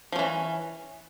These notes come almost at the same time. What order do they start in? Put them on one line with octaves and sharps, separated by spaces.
F3 C#4 E3